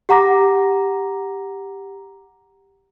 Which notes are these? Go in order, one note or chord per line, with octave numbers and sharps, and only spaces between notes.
G4 F#5 A#5 D6 A#6